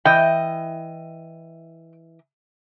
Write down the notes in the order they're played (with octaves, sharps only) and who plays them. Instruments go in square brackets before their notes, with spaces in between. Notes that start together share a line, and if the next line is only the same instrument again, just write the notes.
[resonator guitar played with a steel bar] E3 D#5 [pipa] G5